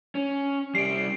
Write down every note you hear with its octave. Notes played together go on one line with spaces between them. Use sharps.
C#4
C3 G3 C7 D7